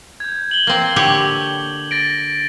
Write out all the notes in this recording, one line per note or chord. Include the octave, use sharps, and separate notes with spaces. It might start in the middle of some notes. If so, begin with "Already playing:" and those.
G6 G#6
F#7 G7
A#3 C4
D3 G4 C#5
A6 A#6 D7